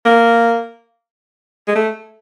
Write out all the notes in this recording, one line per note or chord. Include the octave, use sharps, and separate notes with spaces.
A#3
G#3
A3